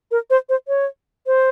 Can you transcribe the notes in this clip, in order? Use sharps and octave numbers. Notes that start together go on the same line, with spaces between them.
A#4
C5
C5
C#5
C5